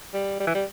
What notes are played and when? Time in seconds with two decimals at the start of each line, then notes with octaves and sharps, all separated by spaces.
0.13 G3
0.40 G3
0.47 E3
0.55 G3